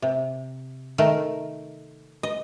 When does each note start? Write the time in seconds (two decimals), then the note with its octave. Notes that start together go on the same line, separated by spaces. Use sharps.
0.02 C3
0.98 D#3 A3 A#4
2.23 D#5